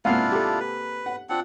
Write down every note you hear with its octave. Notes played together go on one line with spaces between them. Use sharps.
G#2 C3 A#3 D4 E4 F4 F5 F#5
G4 A4
B4
F#5
C4 D4 F4 F#5